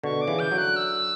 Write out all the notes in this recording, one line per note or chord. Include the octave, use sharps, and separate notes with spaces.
B2 D3 C#6
D6
C#3 E3
G6
D3 F#3
F#6
E6